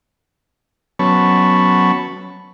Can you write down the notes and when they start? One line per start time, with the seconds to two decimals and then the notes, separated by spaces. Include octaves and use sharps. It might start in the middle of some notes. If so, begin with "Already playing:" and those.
0.99 F#3 B3 C#4 A5 B5 C#6